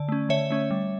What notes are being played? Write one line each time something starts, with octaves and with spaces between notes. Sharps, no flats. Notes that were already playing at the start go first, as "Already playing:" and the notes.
Already playing: D3 D5
A3 C#4
D3 C#5 E5
A3 C#4
G3